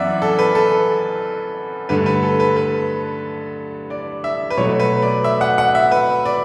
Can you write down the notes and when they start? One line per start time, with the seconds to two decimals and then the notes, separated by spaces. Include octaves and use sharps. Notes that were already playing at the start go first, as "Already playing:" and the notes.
Already playing: F#2 E3 B3 D5 E5 F#5
0.22 A4
0.39 B4
0.55 A4
1.89 G2 D3 A3 B4
2.06 B4
2.23 A4
2.40 B4
2.56 B4
3.90 D5
4.24 E5
4.50 B4
4.57 B2 F#3 A3 C#5
4.80 B4
5.02 D5
5.24 E5
5.41 F#5
5.58 F#5
5.75 E5
5.92 B4
6.26 D5